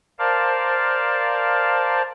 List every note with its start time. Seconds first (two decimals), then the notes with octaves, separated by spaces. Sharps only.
0.19 A#4 C5 D5 F5 A5